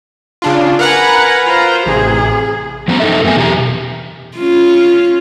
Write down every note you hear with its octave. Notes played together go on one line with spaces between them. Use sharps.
C#3 D4 F4
A#4 B4 F#5 G#5 A#5
F4 C5
A1 C3 G#4
F3 B3 C#4 C5 A#5
D#4 A4 E5
F#2 A3 B3 C4 G#5
E2 B2 G4 A#5
C#4 F4